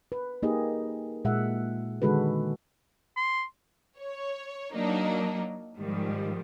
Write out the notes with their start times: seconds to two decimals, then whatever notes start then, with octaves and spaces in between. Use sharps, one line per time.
0.12 B4
0.43 A#3 D#4 G4 G#4 D#5
1.25 A#2 G#3 E5 F#5
2.02 D3 D#3 G#3 F#4 A4 B4
3.17 C6
3.98 C#5
4.74 F#3 A#3 D4 D#4
5.76 G#2 D#3 F3 G3